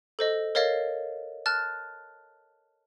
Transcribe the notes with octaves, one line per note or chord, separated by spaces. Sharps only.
A4 C5 D#5
A#4 C#5 D#5 F5 A6 C7
A5 F6 F#6 A6